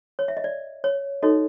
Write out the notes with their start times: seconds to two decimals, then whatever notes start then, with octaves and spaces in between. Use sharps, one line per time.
0.19 C#5
0.28 E5
0.37 D#5
0.44 D5
0.84 C#5
1.22 D#4 F#4 A4 C#5 D#5